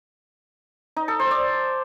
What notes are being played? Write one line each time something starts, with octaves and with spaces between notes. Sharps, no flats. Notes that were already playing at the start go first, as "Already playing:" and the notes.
D#4
A4
C5
D5